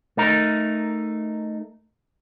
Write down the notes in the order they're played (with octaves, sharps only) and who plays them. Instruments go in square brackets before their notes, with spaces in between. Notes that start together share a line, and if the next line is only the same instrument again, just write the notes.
[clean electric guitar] A3 D#4 A#4